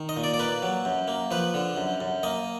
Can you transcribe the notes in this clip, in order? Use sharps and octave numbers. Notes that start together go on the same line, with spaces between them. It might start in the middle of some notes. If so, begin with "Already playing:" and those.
Already playing: D#3
D#5
A#2
D5
D5
A#3 B4
F#3
F#2
A#3
F3 B4
D3
F#2
F#2
A#3 D#5